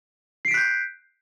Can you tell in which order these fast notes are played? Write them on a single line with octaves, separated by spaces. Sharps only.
C7 D7 B6 F#6 G6